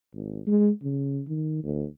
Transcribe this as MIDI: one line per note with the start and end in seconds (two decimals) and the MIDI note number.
0.14 0.40 32
0.47 0.70 56
0.83 1.22 49
1.27 1.60 51
1.64 1.85 38